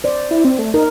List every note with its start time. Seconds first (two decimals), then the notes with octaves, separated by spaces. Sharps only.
0.04 C5 D5
0.31 E4
0.45 C4
0.59 A3
0.74 D#4 A#4